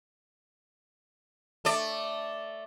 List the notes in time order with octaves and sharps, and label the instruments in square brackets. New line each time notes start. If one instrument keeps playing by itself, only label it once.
[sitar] A3 D5